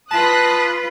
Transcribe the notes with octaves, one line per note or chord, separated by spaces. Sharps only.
F4 B4 A5 D#6 F#6 A#6